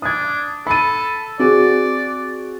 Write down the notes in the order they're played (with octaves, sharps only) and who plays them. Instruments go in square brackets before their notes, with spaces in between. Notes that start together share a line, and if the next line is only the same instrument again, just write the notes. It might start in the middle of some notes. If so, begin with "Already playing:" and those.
[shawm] D4 [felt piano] D#6 G#6
[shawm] A4 [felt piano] B5 D#7
[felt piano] C4 F#4 G#4 [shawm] D5